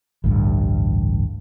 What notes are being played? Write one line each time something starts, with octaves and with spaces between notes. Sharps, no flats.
A1 D2 G2